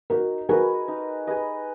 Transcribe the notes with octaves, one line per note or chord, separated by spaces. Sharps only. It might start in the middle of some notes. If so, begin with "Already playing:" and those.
D#4 F#4 A#4
F#4 G#4 A#4 B4 D#5
D#4
G#4 B4 D#5